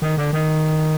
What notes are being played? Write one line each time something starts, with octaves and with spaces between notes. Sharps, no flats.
D#3
D3
D#3